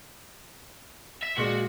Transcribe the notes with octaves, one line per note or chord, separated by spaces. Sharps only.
E5
A#2 G#3 F#4 D5